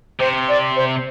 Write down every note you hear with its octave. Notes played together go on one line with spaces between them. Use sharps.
C3 C5
D5
C5